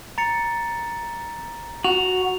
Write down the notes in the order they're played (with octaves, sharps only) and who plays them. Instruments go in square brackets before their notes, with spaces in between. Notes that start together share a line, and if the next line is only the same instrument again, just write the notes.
[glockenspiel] A#5 A6 C#7
[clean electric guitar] F#4 [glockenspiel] F7